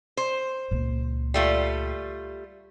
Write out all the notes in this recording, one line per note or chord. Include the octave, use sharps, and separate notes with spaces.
C5
C#2 A#2
G3 A3 F4